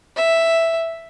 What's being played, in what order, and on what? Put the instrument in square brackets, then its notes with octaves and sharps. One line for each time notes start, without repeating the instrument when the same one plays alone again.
[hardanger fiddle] E5